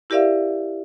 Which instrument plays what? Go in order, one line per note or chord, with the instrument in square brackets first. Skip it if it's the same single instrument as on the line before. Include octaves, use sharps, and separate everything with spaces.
[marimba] E4 G4 A#4 D5 E5 F5